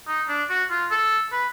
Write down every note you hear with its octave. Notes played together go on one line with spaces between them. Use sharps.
D#4
D4
F#4
F4
A4
B4